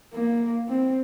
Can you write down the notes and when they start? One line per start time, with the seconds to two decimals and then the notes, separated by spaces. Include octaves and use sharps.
0.14 A#3
0.68 C4